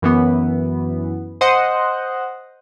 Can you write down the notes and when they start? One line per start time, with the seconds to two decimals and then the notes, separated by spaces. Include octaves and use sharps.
0.02 F#2 E3 B3
1.41 C5 D#5 F#5